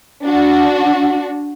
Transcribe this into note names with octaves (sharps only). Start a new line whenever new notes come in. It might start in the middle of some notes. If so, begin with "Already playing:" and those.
D4 F#4